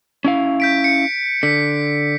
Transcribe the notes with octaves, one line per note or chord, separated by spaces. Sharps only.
C#4 E4 F5
G6 B6 D7
C#7
D3 B6